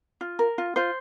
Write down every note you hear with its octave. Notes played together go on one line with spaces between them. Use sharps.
F4
A#4
F4
F4 C5